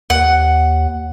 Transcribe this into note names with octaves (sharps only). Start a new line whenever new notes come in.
D#2 F#5